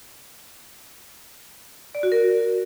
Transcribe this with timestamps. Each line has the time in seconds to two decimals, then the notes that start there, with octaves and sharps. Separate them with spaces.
1.95 D5
2.03 F#4
2.12 A#4